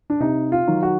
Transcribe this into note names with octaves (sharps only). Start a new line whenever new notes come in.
D4
C3 D#4
F4
D#3 F#3
F#4